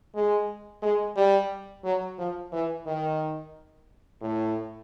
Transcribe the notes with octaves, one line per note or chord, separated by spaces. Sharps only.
G#3
G#3
G3
F#3
F3
E3
D#3
A2